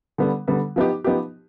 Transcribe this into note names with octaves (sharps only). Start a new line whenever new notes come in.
D3 G3 B3
D3 G3 B3
F3 B3 D#4 G4
F3 B3 D#4 G4